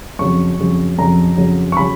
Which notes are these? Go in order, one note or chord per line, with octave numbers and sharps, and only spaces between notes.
F2 C#3 F#3 C#6
F2 C#3 F#3
F2 C#3 F#3 A#5
F2 C#3 F#3
C#6
C#3 F#3 B5